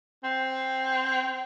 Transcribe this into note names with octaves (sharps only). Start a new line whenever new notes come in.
C4